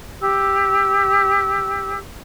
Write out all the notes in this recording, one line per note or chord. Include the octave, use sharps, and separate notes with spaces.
G4 E6